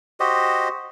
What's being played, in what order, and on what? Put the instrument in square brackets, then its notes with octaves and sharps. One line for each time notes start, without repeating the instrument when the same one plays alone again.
[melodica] F#4 G4 C5 D#5